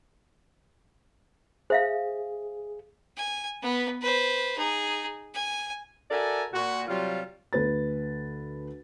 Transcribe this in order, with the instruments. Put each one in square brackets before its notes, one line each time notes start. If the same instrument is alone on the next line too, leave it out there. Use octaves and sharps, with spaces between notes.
[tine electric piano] G#4 [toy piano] C5 E5 F5
[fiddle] G#5
B3 B4
B4 C5
D#4 G#4
G#5
[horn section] F#4 A4 A#4 D5 E5 G#5
A#2 F#4
C3 F#3 G3 F4
[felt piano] D2 B4 A6